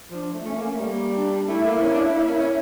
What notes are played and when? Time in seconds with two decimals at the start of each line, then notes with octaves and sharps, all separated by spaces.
0.11 F3 D4
0.34 A3
0.45 A3 C#4
0.57 A#3
0.68 A3
0.79 G3 A#3
1.14 D4
1.48 A3 E4
1.65 A#3
1.82 C#4 E4
1.94 D4
2.16 A#3
2.27 C#4
2.39 C#4